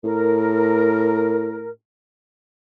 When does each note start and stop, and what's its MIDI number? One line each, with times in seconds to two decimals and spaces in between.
0.04 1.71 45
0.04 1.69 70